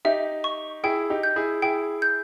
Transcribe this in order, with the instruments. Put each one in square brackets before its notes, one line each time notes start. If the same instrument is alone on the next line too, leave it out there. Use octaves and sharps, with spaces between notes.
[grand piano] D#4 G4 [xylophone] E5
[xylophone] C#6
[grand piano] E4 G#4 [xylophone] G5
[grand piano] D#4 G4
[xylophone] G6
[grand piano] E4 G#4
[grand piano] E4 G#4 [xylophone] G5
[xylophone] G6